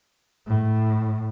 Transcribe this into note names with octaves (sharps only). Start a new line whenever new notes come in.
A2